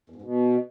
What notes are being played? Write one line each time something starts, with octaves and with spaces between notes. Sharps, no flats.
E2
G#2
B2